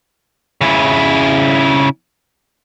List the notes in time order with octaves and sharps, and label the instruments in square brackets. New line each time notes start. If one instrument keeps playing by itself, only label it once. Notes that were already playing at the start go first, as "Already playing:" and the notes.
[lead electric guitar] C#3 E4